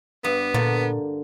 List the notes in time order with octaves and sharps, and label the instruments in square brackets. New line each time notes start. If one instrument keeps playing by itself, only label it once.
[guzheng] G2 [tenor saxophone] B3
[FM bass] A#2 [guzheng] D3 A#3 D5